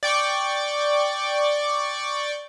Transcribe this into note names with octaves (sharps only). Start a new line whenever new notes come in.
D5 G5 C#6 D6